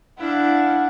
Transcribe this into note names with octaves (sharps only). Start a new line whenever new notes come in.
D4 E4 F5 F#5